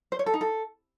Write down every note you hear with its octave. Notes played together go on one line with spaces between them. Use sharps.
C5
C#5
A4
D#4
A4